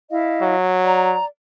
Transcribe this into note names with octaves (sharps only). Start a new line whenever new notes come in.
E4 D#5 F5
F#3
D5 A#5